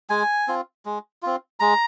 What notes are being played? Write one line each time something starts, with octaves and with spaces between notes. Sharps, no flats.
G#3 G#5
C4 F4
G#3
C4 F4
G#3 A#5